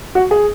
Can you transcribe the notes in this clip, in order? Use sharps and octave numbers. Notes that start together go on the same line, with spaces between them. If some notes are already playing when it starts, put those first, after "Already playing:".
F#4
G#4